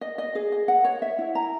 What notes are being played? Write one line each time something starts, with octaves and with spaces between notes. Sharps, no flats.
D#5
D#5
G#4
D#5
F#5
C#5
E5
E4
A#5